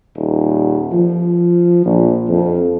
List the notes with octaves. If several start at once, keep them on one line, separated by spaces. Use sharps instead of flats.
D#1
F3
A#1
F2